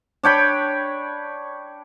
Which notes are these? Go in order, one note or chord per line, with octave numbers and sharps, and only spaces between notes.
D4 C#5 G5 B5